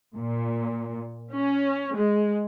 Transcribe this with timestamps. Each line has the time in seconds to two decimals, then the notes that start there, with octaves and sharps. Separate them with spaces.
0.15 A#2
1.32 C#4
1.95 G#3